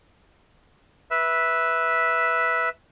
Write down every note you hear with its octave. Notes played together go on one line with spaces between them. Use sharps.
B4 E5